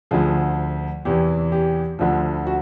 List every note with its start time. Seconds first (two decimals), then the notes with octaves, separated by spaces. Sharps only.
0.11 D2 D3 F3 G#4
1.05 E2 C3 E3 G4
1.52 G4
1.99 D2 D3 F3
2.47 F#4